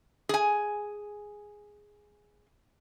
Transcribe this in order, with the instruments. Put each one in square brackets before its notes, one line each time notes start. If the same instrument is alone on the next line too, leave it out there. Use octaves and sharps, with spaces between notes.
[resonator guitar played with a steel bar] G#4 G#5